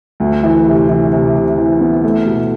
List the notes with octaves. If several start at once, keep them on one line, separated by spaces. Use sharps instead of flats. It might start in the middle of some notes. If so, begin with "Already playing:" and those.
D2
E3
C3
E3
C3
C3
E3
B3
A3
B2